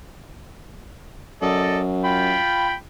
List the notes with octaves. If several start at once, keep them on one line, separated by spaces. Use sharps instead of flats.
F#2 A4 D5 D#5
F4 G5 B5